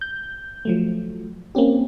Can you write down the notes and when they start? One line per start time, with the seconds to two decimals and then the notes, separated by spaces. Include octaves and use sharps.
0.01 G6
0.65 F3 F#3 A3
1.55 A#3 C4 C#4 G4